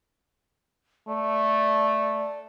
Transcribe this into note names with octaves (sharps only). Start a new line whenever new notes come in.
A3 D5